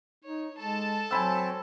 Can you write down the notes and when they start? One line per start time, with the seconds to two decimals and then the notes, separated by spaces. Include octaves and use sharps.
0.24 D#4 C#5
0.58 G#3 A4 A5
1.11 F#3 C4 G#5 B5 E6